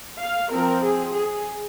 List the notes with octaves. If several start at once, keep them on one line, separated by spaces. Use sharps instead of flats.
F5
F3 C4 A#4
G#4
G#4